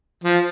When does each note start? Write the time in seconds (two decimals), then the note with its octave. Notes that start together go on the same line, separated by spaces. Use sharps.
0.24 F3